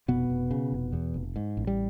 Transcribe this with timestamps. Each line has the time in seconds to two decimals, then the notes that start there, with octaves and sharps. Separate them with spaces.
0.08 F1 B2 B3
0.30 F1
0.51 C#3
0.72 F1
0.93 E2
1.14 F1
1.36 G#2
1.57 A1
1.67 G3